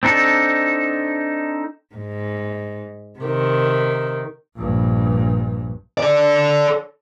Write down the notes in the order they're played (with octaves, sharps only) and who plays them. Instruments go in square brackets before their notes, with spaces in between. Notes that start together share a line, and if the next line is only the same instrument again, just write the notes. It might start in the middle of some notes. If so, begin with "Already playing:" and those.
[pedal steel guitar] C4 D4 D#4 A4
[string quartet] G#2
C3 D#3
[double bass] A#1 G2
[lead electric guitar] A4 D5